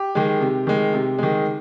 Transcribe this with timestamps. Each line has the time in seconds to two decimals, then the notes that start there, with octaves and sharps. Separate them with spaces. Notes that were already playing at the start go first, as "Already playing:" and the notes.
Already playing: G4
0.15 D#3 G#3
0.41 C3
0.67 D#3 G#3
0.94 C3
1.18 D#3 G#3